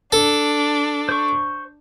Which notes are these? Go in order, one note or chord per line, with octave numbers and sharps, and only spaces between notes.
D4 A4
C5 C#6